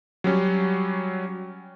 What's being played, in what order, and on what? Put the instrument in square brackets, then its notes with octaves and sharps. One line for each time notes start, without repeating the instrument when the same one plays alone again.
[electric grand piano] F#3 G3 C#4